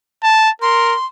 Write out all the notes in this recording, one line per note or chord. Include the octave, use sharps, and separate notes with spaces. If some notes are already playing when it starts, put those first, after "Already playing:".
A5
A#4 C6